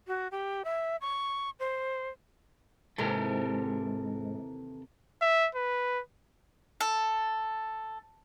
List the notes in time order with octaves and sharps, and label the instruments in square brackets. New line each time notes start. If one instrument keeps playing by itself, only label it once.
[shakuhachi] F#4
G4
E5
C#6
C5
[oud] D#2 C3 E3 [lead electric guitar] G#2 [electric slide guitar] A4 A#4
[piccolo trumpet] E5
B4
[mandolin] A4